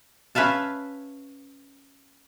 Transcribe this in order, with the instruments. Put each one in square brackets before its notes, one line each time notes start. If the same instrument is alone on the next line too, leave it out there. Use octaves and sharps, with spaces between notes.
[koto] C#4 B4 E5 F5 A5